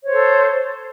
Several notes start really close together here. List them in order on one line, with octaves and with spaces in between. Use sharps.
C#5 C5 A4